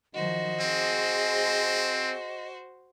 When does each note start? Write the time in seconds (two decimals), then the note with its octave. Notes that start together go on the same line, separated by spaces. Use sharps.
0.14 D#3 F3 F#4 C5 D#5
0.61 C4 G#4